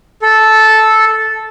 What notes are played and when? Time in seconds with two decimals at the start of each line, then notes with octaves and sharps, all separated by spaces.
0.22 A4